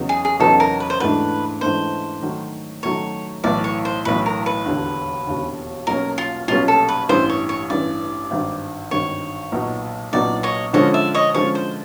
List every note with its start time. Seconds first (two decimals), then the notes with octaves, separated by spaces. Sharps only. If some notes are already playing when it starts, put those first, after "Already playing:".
Already playing: E2 C#3 F#3 B3 D#4
0.09 G#4
0.25 G#4
0.40 E2 C#3 F#3 B3 D#4 A4
0.60 A#4
0.80 B4
0.90 C5
1.00 G#2 E3 A3 D4 B4
1.61 G#2 E3 A3 D4 C5
2.22 D#3 F#3 A3
2.83 D#3 F#3 A3 C#5
3.44 B1 A2 E3 D5
3.64 C#5
3.85 C5
4.05 B1 A2 E3 B4
4.26 A#4
4.46 B4
4.66 E1 D#2 D3
5.27 E1 D#2 D3
5.87 B1 B2 G3 A#3 C#4 A#4
6.18 F4
6.48 B1 B2 G3 A#3 C#4 F4
6.68 A4
6.88 B4
7.09 A1 G2 E3 C5
7.30 C#5
7.49 C#5
7.70 A1 G2 E3 D5
8.31 G#1 G2 D#3
8.91 G#1 G2 D#3 C#5
9.52 B1 A#2 F#3 B3 D#4
10.13 B1 A#2 F#3 B3 D#4 D5
10.43 C#5 D#5
10.73 D3 F3 G#3 C#4 F4 C#5 D#5
10.94 D5 E5
11.14 C#5 D#5
11.34 D3 F3 G#3 C#4 F4 C#5
11.55 C5